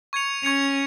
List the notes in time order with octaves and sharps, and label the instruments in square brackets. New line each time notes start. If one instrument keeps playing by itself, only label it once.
[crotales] C#6 G#6 C#7 F7
[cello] C#4 [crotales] C#6 G#6 C#7 F7